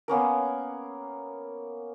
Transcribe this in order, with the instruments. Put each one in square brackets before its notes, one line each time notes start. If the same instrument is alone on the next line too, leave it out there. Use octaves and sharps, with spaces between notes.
[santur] A#3 B3 C#4 A#4